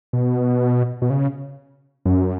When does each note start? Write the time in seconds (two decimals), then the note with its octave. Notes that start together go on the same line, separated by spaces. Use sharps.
0.13 B2
1.02 B2
1.10 C#3
2.05 F#2